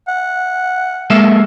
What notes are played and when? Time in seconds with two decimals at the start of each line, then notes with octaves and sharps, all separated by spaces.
0.08 F#5
1.10 G#3 A#3 E5